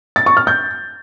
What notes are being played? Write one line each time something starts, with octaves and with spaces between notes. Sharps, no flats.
A6
C#6
F6
G6